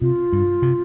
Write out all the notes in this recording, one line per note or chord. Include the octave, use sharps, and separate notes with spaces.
C3 F4
G2
C3